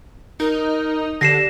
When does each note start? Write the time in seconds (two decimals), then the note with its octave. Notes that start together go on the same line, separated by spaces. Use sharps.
0.40 D#4 A#4
1.21 D3 G4 A#6 C7 E7